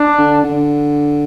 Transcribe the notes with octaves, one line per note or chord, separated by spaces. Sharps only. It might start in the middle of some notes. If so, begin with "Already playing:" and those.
Already playing: D4
D3
D3